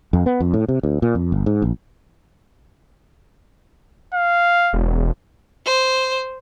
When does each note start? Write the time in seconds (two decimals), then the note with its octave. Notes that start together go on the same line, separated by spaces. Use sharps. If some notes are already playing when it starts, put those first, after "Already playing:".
0.13 F2
0.26 B3
0.41 F2
0.54 A2
0.69 C3
0.83 D2
1.02 A#2
1.15 F2
1.32 G1
1.46 G#2
1.62 A#1
4.14 F5
4.73 E1
5.66 C5